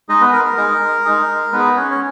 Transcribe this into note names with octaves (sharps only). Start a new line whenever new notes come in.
G#3 D#4 G#4 D#5
B3 B4
A#4
A#4
G#3 D#4 G#4
G#3 D#4 G#4
G#3 B3 D#4 G#4 B4
C#4 C#5
C#5